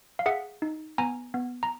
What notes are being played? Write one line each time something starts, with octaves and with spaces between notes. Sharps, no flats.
F5
G#4 E5 F#5
D#4
B3 G#5 A#5
B3
A#5